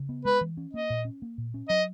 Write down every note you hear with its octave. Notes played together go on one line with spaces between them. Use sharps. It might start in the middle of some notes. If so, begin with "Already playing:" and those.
Already playing: C#3
B3
G#3 B4
E3
C#4
A#3 D#5
A#2
C#4
A#3
A#2
C#4
F#3 D#5